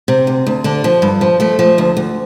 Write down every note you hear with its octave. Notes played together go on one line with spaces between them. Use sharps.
C3
D2
D2
D3 D4
F3
G2
F3
F3 A3
F3
D2
D2